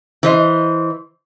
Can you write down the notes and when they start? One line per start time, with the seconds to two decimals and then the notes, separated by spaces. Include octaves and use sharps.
0.23 E3 C5 D#5